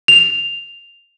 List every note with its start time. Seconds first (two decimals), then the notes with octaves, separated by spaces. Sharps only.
0.08 F7